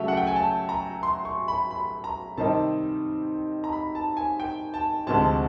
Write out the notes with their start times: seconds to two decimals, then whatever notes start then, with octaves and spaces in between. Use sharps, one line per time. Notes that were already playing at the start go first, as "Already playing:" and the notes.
Already playing: C#3 F#3 A3 E5
0.08 F#5
0.17 G5
0.27 G#5
0.36 A5
0.69 A#5
1.03 C6
1.25 C#6
1.48 B5
1.71 B5
2.04 A#5
2.37 C3 D#3 G3 C4 D#4 A5
3.64 A#5
3.73 B5
3.95 A5
4.17 G#5
4.40 G5
4.74 A5
5.07 D2 C3 F3 G#3 A5